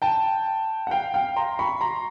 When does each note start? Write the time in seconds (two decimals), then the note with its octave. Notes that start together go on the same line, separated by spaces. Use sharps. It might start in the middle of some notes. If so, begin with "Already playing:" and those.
0.02 G5 A5
0.87 F#5
0.91 F5 G5
1.14 F5 G5
1.36 A#5 C6
1.59 B5 C#6
1.81 A#5 C6